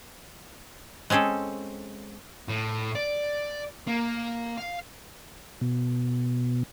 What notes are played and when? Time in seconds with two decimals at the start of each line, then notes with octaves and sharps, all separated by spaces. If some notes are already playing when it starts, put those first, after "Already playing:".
1.10 G#3 C4 C#4 G#4 A4
2.48 A2
2.95 D5
3.88 A#3
4.58 F5
5.61 B2